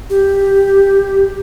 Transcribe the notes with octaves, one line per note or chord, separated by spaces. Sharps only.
G4